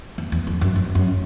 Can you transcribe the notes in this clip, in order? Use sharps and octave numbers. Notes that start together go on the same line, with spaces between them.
E2
E2
F2
F#2
F2
F#2